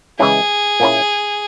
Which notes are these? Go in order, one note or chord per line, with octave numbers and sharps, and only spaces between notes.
C#3 E3 G#3 C#4 E4 G#4
A#2 A#3 C#4 E4